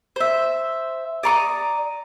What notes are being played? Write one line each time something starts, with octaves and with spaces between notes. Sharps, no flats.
C5 E5
D5 A#5 C#6 D#6